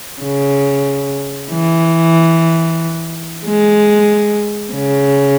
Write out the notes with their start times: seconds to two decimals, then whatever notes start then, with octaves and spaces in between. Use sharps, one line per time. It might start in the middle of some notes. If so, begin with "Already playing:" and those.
0.22 C#3
1.51 E3
3.45 G#3
4.73 C#3